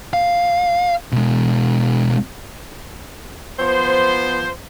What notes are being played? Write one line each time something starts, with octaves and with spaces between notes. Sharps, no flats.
F5
B2 G#3
F3 B3 C5